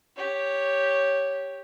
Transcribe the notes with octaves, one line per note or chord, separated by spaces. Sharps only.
G4 C#5